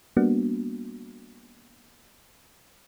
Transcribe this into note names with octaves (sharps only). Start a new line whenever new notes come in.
G3 A#3 B3 D4 F#4